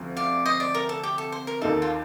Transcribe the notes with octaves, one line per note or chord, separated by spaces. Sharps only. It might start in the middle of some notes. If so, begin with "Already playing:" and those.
Already playing: D2 C3 F3
D5 F5
C5 D#5
D5
A#4
A4
G4
A4
C5
A#4
D#2 D#3 A#3 D#4 A4
F4